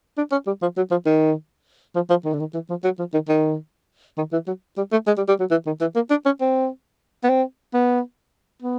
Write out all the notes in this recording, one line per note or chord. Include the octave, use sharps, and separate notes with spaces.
D4
C#4
G3
F3
F#3
F3
D#3
F3
F3
D#3
D3
D#3
E3
F3
F#3
F3
D#3
D#3
D#3
E3
F#3
G3
A3
G#3
G3
G3
F#3
E3
D#3
E3
A#3
D4
C#4
C4
B3
C4
B3
B3